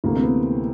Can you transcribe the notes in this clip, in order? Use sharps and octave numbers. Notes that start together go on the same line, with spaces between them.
D2 C3 E3 A3 A#3
C4
B3